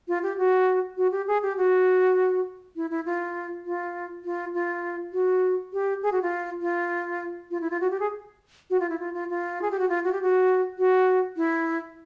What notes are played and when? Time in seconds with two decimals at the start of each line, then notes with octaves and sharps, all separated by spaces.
0.08 F4
0.23 G4
0.38 F#4
0.97 F#4
1.12 G4
1.28 G#4
1.43 G4
1.57 F#4
2.76 E4
2.90 E4
3.05 F4
3.65 F4
4.25 F4
4.54 F4
5.13 F#4
5.73 G4
6.03 G#4
6.12 F#4
6.22 F4
6.61 F4
7.51 F4
7.61 E4
7.70 F4
7.81 F#4
7.91 G4
8.00 G#4
8.70 F#4
8.80 F4
8.89 E4
8.99 F4
9.14 F4
9.30 F4
9.62 G#4
9.71 G4
9.79 F#4
9.89 F4
10.04 F#4
10.12 G4
10.22 F#4
10.78 F#4
11.37 E4